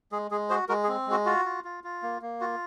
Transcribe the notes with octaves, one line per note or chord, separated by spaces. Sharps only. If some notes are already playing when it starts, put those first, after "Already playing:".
G#3 G#4
G#3 G#4
F#4 G#4 C5
G#3 F#4 A#4
G#4
C4
G#3 F#4
F4 F#4
F4
F4
F4
A#3
A#3
F4 F#4